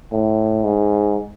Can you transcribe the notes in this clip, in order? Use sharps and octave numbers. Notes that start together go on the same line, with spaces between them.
A2
G#2